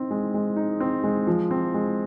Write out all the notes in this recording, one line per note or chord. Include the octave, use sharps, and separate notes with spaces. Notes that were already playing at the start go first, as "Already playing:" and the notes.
Already playing: C4 D#4
G#3
G#3
D#4
C4
G#3
F3
C4
G#3